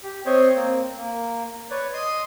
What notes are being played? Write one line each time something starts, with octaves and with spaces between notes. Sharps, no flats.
G4
C4 C5 C#5 D#5
A#3 C4
A#3
B4 C#5 D5
D#5 C6 D#6